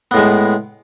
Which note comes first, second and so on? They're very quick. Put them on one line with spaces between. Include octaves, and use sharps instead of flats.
B3 A2 G#3